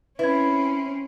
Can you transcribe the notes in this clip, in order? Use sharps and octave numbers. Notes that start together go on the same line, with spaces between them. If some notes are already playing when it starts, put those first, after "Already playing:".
C4 C#4 E4 B4 G#6